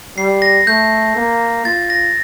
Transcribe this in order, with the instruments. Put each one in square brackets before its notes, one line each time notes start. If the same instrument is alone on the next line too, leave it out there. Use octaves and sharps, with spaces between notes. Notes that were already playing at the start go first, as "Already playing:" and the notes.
[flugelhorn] G3 [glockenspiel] C7
[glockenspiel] A#6
[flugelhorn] A3 [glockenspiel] G6
[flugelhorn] A#3
[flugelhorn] F4 [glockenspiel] A6
[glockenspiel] A#6